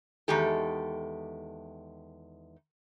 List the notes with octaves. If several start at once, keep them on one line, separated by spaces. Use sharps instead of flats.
E2 D#3 G#3 G4 A4